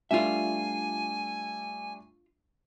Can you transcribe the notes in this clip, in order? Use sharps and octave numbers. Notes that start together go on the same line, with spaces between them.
G3 A3 D4 F4 E5 G#5